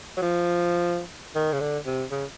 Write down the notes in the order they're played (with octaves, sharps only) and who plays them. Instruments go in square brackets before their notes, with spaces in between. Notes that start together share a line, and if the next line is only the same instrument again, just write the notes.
[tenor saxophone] F#3
F3
D#3
C#3
D3
C3
C#3